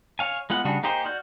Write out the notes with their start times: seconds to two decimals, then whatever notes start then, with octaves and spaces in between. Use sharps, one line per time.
0.19 C#5 F5 G#5
0.50 G#3 B3 F4 F#5
0.65 C#3 G3 D4 F#4 G#4
0.83 A#3 D#4 G4 G#4 C5
1.05 F#4 D5 F6 G6